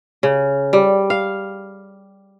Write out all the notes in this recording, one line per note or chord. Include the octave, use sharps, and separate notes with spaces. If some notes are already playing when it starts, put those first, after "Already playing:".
C#3
G3
F5